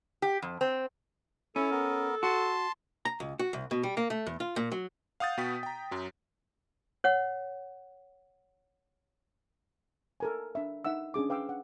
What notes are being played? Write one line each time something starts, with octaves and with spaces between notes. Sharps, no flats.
G4
F2
C4
C#4 E4 A4
B3 A#4
F#4 A5 C6
A#5
C#2
F#4
C2
B2
G3
A#3
A3
E2
F4
A#2
F#3
F5 F#5 D#6 G6 A6
B2 B3 F#4 G5 B6
G5 A#5
F#2 F#3
C#5 F#5
A4 A#4 G#5
D4 E5
D#4 E5 F#5 E6
C#4 D4 G#4 D6
B4 F5 G5 D6 E6
F#5